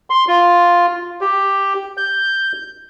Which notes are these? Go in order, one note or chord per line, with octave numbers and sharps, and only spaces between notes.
C6
F4
G4
G6